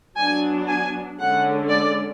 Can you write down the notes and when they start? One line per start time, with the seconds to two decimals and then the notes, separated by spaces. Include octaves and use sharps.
0.18 F#3 B3 D4 G#5
0.69 G#5
1.19 D3 G#3 C#4 F#5
1.70 D5